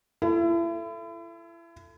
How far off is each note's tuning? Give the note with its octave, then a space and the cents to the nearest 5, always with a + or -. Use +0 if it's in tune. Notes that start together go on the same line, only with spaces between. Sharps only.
E4 +35 A4 +5